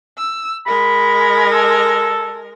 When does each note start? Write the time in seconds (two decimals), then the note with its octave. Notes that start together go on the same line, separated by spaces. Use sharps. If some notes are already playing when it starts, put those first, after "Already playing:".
0.17 E6
0.66 G#3 A#4 B5
1.52 A4